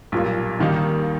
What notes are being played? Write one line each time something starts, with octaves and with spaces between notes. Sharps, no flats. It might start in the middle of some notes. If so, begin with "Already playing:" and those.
B1 A#2 G3
D#2 D#3 G3 A#3 D#4